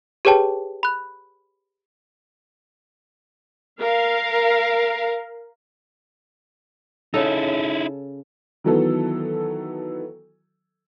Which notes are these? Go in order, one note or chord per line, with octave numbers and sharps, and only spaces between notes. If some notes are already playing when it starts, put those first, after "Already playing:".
G4 G#4 B4 C#5 G5 A5
B5 F#6
A#4 F5
C#3 D#4 E4 A4
D#3 E3 F#3 B3 A4